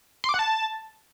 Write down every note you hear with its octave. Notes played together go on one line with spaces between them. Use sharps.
C6
D6
F#5
A5